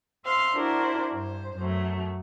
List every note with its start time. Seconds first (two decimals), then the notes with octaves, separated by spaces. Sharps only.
0.24 C5 E5 F5 C6
0.55 D4 E4 F#4 A#4 C5 D5
1.11 G2 C5
1.57 F#2 F#3 A3